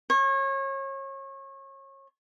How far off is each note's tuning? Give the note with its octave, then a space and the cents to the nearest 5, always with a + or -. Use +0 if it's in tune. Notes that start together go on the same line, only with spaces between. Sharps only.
C#5 -30